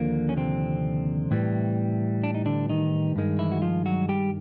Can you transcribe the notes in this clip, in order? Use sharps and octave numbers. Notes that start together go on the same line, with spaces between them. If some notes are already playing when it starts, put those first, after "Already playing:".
Already playing: D#2 D3 F3 A#3
C#4
C3 C4
A2 E3 G3
D4
D#4
D3 D4
D#3 D#4
G2 D#3 G#3
E3 E4
F#4
F3 F4
F#3 F#4
G3 G4